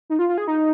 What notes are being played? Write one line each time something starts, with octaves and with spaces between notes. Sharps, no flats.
D#4
F4
F4
G#4
D#4